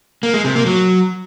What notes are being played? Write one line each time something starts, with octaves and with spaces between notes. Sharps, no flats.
A#3
G#3
C3
A#3
F#3